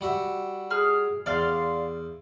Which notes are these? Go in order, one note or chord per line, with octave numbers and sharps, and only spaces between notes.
G3 F#4 E5
G#4 F6
E2 D5 F5 C6